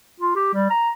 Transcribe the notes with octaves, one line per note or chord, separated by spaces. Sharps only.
F4
G4
G3
A#5